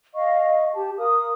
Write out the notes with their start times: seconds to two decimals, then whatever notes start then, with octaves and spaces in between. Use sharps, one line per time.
0.14 D#5 F5 C#6
0.74 G4 A5
0.98 A#4 F5 D#6